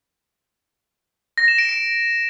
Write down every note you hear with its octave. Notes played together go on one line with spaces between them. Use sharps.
A#6
E7
D7
D7